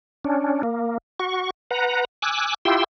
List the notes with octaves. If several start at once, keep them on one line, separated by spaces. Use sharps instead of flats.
C#4 D4
A#3
F#4 C#6
B4 F#5 A#5
G#5 D6 E6 F#6
E4 F4 G4 G5 C6 E6